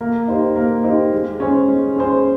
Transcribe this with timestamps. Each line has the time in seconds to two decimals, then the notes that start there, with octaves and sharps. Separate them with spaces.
0.01 A#3
0.28 D#4 G4 C5
0.56 A#3
0.84 D#4 G4 C5
1.12 G#3
1.40 C#4 G#4 C5
1.68 G#3
1.96 C#4 G#4 C5